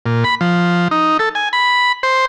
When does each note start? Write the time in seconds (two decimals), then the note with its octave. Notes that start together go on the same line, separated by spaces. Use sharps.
0.06 A#2
0.24 B5
0.41 F3
0.91 D#4
1.19 A4
1.35 G#5
1.53 B5
2.03 C5